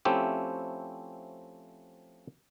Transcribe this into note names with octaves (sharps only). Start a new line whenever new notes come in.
F3 A3 C4 C#4 E4 G4